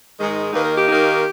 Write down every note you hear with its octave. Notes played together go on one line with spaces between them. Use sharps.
G#2 D#3 G#3 D#4
D#2 D#3 A#3 D#4 B4
A#4
G4
D#2 D#3 A#3 D#4